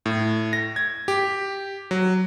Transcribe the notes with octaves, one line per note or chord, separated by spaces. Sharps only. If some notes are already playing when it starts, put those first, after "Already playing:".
A2
A#6
G#6
G4
F#3